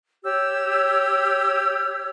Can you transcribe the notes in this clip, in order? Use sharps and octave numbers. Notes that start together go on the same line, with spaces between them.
G4 C#5 E6